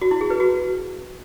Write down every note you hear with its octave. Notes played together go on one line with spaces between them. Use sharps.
F#4
E4
G#4
B4
F#4